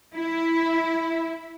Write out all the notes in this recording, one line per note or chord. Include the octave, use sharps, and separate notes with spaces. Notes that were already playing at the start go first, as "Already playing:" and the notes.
E4